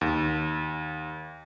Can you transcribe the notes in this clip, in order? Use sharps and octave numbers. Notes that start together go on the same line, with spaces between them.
D#2